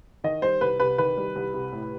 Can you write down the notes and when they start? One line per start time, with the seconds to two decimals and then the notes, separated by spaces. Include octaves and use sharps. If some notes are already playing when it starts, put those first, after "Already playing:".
0.24 D#3 D#5
0.42 G3 C5
0.61 C2 B4
0.80 C3 B4
0.98 D#3 B4
1.17 G3
1.36 C2
1.54 C3
1.72 A2